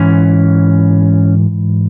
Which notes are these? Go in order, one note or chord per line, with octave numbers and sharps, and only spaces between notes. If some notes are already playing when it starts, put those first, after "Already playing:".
Already playing: G#2 E3 C#4